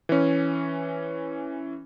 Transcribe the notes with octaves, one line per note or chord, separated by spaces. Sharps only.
E3 C#4